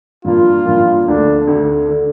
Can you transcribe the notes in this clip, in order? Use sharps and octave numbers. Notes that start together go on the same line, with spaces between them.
G2 F3 A#3 F4
G2 F3 A#3
D2 D3 A3 D4
D2 D3 A3
D3 A3